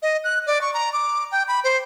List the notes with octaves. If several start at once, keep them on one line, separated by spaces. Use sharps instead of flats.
D#5
F#6
D5
C#6
A#5
D6
G5
B5
C5